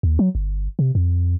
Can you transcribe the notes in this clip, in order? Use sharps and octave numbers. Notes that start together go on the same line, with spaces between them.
D#2
F#3
G1
C3
F2